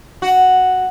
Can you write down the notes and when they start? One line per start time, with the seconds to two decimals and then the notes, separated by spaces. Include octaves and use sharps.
0.22 F#4